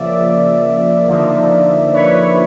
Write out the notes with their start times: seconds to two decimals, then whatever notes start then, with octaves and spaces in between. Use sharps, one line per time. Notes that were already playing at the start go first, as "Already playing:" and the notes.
Already playing: C#3 F3 A#3 D5 E5
1.07 D3 F3 A#3 D#4
1.93 B4 C#5